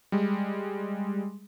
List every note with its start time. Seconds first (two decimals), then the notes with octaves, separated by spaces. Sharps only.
0.12 G3 G#3